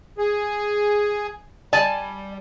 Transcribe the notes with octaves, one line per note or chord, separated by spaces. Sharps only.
G#4
G3 D5 G#5 A5